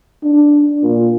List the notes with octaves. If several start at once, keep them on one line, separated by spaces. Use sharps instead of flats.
D4
A#2